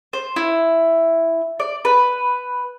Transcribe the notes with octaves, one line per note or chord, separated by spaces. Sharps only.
C5
E4
D5
B4